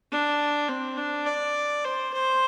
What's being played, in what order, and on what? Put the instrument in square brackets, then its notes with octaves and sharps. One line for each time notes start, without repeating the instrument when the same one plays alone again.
[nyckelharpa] D4
C4
D4
D5
C5
C5